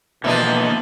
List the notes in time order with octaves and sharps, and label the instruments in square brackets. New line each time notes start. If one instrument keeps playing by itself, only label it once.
[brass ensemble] B2 [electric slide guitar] D3 A#3 D#5 [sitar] E3 F3 D4